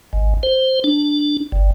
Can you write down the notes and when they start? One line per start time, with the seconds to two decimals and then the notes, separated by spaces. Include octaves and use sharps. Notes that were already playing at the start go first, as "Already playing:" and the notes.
0.13 G#1
0.43 C5
0.84 D4
1.52 G1